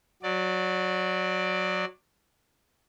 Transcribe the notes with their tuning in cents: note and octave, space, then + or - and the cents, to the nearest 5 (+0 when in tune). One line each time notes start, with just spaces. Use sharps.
F#3 -10 D5 +10